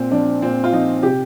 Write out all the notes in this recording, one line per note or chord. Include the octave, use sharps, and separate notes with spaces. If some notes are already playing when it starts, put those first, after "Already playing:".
Already playing: A#2 C4
F3 D4
A#2 C4
F4
F3 D#4
C3 G4